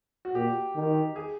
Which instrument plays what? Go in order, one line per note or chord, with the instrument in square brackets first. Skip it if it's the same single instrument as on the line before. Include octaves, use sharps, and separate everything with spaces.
[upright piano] F#4
[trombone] A#2 [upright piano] G4
[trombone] D#3
[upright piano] G#4